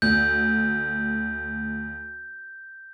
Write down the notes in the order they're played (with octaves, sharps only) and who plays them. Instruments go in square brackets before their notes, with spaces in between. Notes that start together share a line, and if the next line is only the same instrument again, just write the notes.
[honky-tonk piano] D2 [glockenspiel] G6